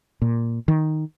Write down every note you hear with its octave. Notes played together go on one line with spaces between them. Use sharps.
A#2
D#3